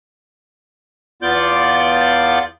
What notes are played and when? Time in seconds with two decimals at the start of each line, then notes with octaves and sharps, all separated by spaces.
1.22 E2 B3 F4 D5 D6 G6